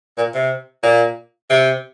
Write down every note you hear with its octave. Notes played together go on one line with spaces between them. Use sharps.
A#2
C3
A#2
C3